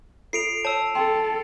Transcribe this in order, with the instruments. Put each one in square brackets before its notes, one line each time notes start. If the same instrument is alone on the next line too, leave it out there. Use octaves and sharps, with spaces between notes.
[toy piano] F4 A4 [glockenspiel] C7 D7 F7
[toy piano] C#5 [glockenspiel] A5 E6
[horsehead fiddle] A4 [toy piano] G5 C6